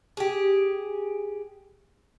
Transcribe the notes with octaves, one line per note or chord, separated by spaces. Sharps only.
G4 G#4